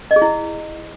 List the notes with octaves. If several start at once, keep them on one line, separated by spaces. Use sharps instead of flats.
D#5
G#4
E4